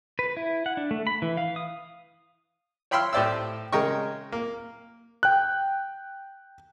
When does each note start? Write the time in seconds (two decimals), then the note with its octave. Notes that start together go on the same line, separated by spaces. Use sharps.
0.19 B4
0.37 E4
0.66 F#5
0.77 D4
0.91 A3
1.07 B5
1.22 E3
1.37 F5
1.56 D#6
2.91 C#5 G5 B5 C6 E6 F6
3.13 A2 G4 C5 D5 E5 E6
3.72 C#3 G#3 A#4 D#5 G5 C#6
4.32 A#3
5.23 G5 F#6